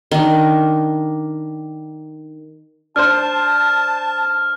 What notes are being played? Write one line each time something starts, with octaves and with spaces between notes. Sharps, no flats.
D#3 D4
D4 C5 A5 F6